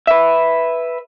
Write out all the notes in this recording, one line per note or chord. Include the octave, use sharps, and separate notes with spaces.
B4 E5